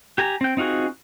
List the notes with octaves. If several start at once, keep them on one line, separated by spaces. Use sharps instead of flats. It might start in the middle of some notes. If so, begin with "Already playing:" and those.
G4 G#5 A#5
C4 G5
C4 D#4 F4 F#4 G#4